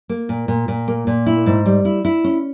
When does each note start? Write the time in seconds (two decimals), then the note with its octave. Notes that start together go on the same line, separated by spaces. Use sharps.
0.09 A#3
0.29 A#2
0.48 A#2
0.68 A#2
0.88 A#3
1.07 A#2
1.26 E4
1.46 G#2
1.66 G3
1.85 E4
2.05 E4
2.24 C#4